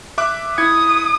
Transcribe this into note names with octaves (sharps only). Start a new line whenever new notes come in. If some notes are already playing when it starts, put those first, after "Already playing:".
E5 D6 F#6
E4 D#6 G#6 C#7